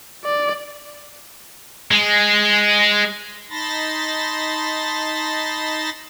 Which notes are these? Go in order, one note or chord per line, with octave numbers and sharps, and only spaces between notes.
D5
G#3
D#4 A5 B5 C6 A6 A#6